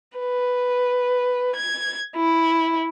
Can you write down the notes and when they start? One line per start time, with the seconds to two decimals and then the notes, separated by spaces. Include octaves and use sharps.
0.17 B4
1.54 G#6
2.15 E4